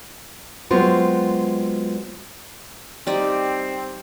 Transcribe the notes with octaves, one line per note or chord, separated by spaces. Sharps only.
F#3 G#3 B3 C4 F4 F#4
G3 C4 D#4 D5